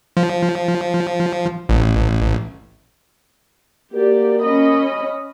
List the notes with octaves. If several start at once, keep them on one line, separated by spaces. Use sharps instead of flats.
F3
A1
A#3 F#4 G4 A#4 D5
C#4 D#5 B5